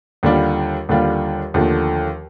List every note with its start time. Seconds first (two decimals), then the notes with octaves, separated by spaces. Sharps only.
0.23 D#2 D3 G3 D4 F4
0.89 D#2 D3 G3 D4 F4
1.54 D#2 D3 F3 A3